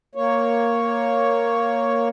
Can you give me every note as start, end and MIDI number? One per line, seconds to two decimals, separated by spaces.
0.15 2.09 58
0.15 2.09 73